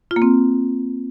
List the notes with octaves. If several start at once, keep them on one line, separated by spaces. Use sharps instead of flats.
F4
A#3
C4